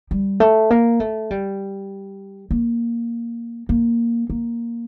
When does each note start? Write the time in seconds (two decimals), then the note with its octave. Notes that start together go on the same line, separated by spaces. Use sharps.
0.11 G3
0.40 A3
0.70 A#3
1.00 A3
1.31 G3
2.51 A#3
3.69 A#3
4.30 A#3